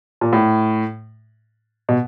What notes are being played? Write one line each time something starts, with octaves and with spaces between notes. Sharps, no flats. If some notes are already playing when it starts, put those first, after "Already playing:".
A#2
A2
B2